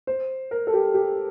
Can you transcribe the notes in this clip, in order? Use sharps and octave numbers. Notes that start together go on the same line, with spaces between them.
C5
A#4
A4
G4
G4